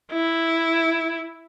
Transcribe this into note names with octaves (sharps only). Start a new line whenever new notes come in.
E4